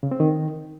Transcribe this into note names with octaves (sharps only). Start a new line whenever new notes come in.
C#3
C4
D#3